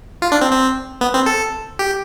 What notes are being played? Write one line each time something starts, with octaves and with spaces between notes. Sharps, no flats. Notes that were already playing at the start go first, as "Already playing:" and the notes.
F4
D4
C4
C4
B3
C4
A4
G4